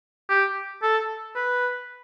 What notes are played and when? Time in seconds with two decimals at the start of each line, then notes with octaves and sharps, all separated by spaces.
0.29 G4
0.83 A4
1.36 B4